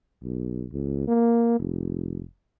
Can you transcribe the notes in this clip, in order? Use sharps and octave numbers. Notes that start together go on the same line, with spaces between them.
B1
C#2
A#3
F1